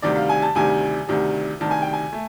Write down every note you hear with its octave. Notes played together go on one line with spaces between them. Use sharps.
D2 C3 D#3 G3 D5
F5
G#5
A5
D2 C3 D#3 G3 G#5
D2 C3 D#3 G3
D2 C3 D#3 G3 A5
G#5
G5
G#5
A3